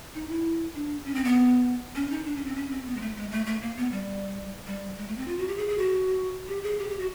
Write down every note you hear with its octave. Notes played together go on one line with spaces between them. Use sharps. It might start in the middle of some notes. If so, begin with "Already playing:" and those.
D#4
E4
D4
C#4
C4
B3
C#4
D#4
D4
C#4
C4
C#4
C4
B3
G#3
A3
G#3
A3
A3
A#3
B3
G3
G3
G#3
A3
C4
F4
F#4
G4
G#4
G#4
F#4
G4
G#4
G4
G4
F#4